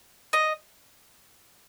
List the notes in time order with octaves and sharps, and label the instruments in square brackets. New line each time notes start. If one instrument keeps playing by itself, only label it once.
[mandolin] D#5